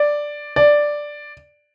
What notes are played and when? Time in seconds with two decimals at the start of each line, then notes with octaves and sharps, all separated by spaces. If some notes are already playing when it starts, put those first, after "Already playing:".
Already playing: D5
0.56 D5